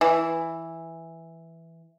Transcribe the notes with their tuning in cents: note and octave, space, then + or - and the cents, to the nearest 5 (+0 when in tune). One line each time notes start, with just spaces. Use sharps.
E3 +0